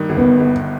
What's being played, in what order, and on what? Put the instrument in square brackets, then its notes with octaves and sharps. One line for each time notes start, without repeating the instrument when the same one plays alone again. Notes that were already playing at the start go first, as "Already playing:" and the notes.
Already playing: [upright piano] G2 D#3
G1
[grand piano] B3
[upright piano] G1